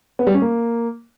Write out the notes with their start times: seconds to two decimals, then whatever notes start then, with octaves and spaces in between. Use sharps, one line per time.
0.19 B3
0.27 G3
0.34 C#4
0.42 A#3